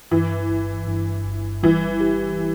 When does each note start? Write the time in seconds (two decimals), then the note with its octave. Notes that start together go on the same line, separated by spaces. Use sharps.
0.11 G2 E3
0.50 G1
0.88 G2
1.26 G1
1.63 E3 G3
2.00 G4
2.39 G4